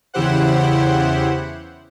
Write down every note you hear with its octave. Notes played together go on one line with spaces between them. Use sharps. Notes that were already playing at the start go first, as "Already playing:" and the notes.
E2 C#3 E4 G4 C5 F#5